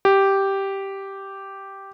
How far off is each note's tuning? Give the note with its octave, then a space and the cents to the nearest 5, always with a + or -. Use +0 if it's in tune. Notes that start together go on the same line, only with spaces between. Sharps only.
G4 -5